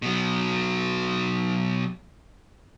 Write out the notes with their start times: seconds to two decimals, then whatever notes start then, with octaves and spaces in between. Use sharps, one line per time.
0.02 B2 F#3